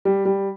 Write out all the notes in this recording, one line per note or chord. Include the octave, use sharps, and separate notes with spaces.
G3
G3